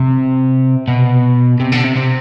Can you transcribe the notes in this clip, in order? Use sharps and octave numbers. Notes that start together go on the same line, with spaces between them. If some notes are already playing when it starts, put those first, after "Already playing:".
Already playing: C3
B2
C3
D3
C3
C3